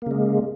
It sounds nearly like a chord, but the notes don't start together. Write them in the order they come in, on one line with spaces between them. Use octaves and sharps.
A#3 C#3 G#3